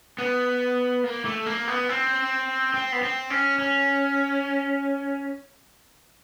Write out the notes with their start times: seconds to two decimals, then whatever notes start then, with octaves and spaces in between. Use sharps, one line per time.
0.18 B3
1.04 A#3
1.25 A3
1.46 A#3
1.68 B3
1.89 C4
2.74 C4
2.92 B3
3.02 C4
3.30 C#4
3.59 C#4